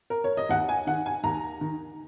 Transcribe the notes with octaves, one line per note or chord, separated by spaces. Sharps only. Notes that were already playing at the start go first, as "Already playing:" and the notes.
A#4
C#5
D#5
D#2 F#5
G#5
D#3 F#5
G#5
D#2 A#5
D#3